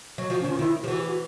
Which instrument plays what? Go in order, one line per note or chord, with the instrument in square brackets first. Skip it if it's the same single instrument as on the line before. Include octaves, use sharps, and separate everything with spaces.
[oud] F#3
[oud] F3 [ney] F#4
[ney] C#4
[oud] D#3
[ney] F4
[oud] D#3 [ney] E4
[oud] F3 [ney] G4
[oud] E3 [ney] F#4
[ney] G4
F#4